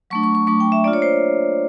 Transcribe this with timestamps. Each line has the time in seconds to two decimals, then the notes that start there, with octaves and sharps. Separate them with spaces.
0.10 F#3 A3 D4 C#6
0.23 C#6
0.35 C#6
0.47 F#3 A3 D4 C#6
0.60 G5
0.72 E5
0.84 A#3 D4 F4 D5
0.93 C#5
1.02 C5